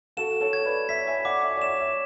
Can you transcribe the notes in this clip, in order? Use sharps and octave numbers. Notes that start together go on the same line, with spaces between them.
F#4 A4 E7
A4 C#5
G#6
B4 D5
C#5 E5 B6
E5 G#5
D5 F#5 D6
C#5 E5
D5
C#5 E5 E7
C#5 E5